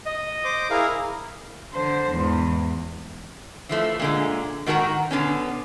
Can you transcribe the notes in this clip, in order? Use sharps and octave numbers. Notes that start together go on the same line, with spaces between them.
D#5
C5 D6
E4 G#4 A#4 F5
D3 C5
E2 G#2
E3 F3 A3
A#2 D3 G#3
G#2 D#3 F#4 A4 F#5 A#5
B2 D3 B3 C#4